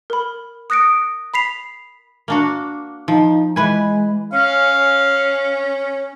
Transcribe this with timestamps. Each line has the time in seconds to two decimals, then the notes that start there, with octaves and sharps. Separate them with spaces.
0.10 A#4 B5
0.70 D#6 F#6 A#6 C#7 D7
1.34 B5 B6 C7 F7
2.28 A#3 D4 F#4
3.08 F3 D#4
3.56 E3 G#3 B4 G#5
4.33 C#4 F5